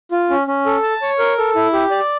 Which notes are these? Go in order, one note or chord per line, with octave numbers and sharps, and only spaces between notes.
F4
C#4
C#4
A4
A5
C#5
A#4
A4
E4
G4
D5